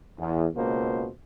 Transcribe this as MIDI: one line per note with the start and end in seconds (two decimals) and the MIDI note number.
0.19 0.47 40
0.55 1.09 37
0.55 1.09 47
0.55 1.09 58
0.55 1.09 72